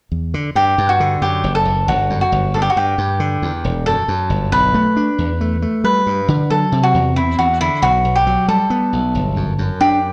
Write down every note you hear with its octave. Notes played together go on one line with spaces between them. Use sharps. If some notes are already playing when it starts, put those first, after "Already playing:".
E2
D3
G2 G4
G2
F#4
D3
F#2 G4
F#1
A4
F#1
G1 F#4
F#2
F#4
G1
G2 A4
G4
F#4
G2 G4
G2
D3
E2
E1
F#2 A4
F#2
G1
B1 B4
A3
D4
E2
A3
A3
G3 B4
G2
D3
F#3 A4
C3
F#4
E2
C4 E4
E2 F#4
D3 E4
B1 F#4
B1
G4
F#3
G3 A4
B3
B1
G1
F#2
F#2
D4 G4